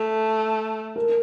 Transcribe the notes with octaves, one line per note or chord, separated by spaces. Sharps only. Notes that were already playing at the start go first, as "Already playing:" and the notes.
Already playing: A3 A4
A#4